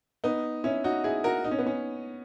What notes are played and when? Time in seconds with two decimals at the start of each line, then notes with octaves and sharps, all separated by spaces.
0.24 B3 D#4
0.64 C#4 E4
0.84 D#4 F#4
1.04 E4 G#4
1.24 F#4 A#4
1.44 D#4
1.51 C#4
1.59 B3
1.66 C#4